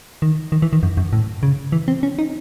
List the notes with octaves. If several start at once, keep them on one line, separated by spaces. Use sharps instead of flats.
D#3
D#3
E3
D#3
F#2
F#2
A2
C#3
E3
C4
C#4
D#4